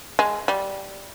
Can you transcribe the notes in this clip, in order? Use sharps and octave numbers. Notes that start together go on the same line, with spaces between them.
G#3
G3